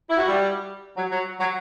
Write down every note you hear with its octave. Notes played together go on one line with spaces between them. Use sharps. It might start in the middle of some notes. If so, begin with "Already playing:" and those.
E4
F#4
G3
F#3
F#3
F#3